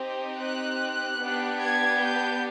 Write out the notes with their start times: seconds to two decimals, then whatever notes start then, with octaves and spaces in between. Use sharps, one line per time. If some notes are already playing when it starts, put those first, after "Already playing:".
Already playing: C4 D#4 G4
0.40 F#6
1.20 B3 D4 G4
1.60 G#6
2.00 G6